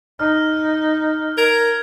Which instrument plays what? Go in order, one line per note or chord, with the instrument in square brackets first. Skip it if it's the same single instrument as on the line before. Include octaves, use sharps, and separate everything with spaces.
[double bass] D#4 [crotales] F6
[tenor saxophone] A#4 [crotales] G#6